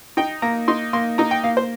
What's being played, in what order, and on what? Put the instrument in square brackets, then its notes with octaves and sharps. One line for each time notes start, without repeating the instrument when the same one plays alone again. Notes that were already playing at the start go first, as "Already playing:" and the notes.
[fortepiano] D#4 G5
A#3 A#5
D#4 C6
A#3 C6
D#4 A#5
G5
A#3 F5
C5